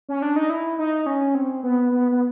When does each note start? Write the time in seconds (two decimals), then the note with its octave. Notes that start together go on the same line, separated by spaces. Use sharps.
0.09 C#4
0.22 D4
0.36 D#4
0.50 E4
0.78 D#4
1.06 C#4
1.35 C4
1.63 B3
1.92 B3
2.12 B3